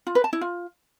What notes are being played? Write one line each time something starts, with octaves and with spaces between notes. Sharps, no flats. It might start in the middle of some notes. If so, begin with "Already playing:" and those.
F4
B4
A5
E4
F4